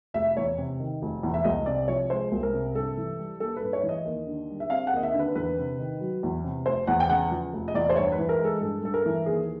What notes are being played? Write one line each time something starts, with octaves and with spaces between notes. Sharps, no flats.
F1 E5
E2 C#5
C3
D#3
F1
E2
E5
C2 D#5
C3 D5
F3 C#5
G#3 C5
C2
A#4
C3
G2 A4
E3
G3
A#3 A4
B4
G2
C#5
E3
D#5
D#2
D3
G3
E5
C4 F5
F#5
D#2 D#5
E5
D3
B4
E2 B4
C3
D#3
F#3
E2
C3
F1 C5
E2 F#5
G5
C#3 F#5
F3
F1
D#5
E2 D5
C5
G2 C#5
B4
E3
A#4
G#3
A4
G2 A4
G2 A4
A#4
E3
D#2 G#4